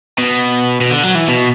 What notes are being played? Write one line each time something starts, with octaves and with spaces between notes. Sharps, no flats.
B2
B2
D3
F#3
E3
B2